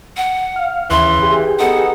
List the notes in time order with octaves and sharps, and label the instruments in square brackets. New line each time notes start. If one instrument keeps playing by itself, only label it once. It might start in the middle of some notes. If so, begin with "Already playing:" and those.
[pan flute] F#5
[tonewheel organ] F5
[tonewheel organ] D#2 [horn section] C#3 E3 [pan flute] C6
[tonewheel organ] G4 G#4
[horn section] B3 D#4 A4 [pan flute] F#5